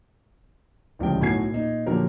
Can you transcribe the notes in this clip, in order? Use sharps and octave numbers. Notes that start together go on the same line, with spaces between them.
D1 C#2 F3 G3 G5
B1 A2 F#4 G#5 G#6 C7
A#2 D#4
A#2 D3 F3 F#3 G4 A#4